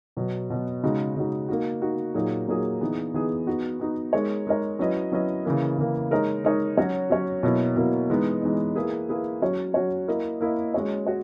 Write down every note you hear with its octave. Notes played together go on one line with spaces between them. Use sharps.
B2 F#3 B3
B2 F#3 B3
C#3 G#3 D#4 F#4
C#3 G#3 D#4 F#4
A#3 D#4 F#4
A#3 D#4 F#4
A#2 F#3 A#3 D#4 G#4
A#2 F#3 A#3 D#4 G#4
E3 B3 D#4 G#4
E3 B3 D#4 G#4
B3 D#4 F#4
B3 D#4 F#4
G#3 D#4 A#4 C#5
G#3 D#4 A#4 C#5
F#3 C#4 E4 B4 D#5
F#3 C#4 E4 B4 D#5
C#3 E3 A#3
C#3 E3 A#3
G#3 D#4 A#4 C#5
G#3 D#4 A#4 C#5
F#3 C#4 F#4 C#5
F#3 C#4 F#4 C#5
B2 F#3 A#3 E4
B2 F#3 A#3 E4
E3 G#3 B3 D#4
E3 G#3 B3 D#4
A#3 E4 G#4 B4
A#3 E4 G#4 B4
F#3 C#4 F#4 C#5
F#3 C#4 F#4 C#5
A#3 E4 A#4 D#5
A#3 E4 A#4 D#5
G#3 C#4 F#4 C#5
F#4 C#5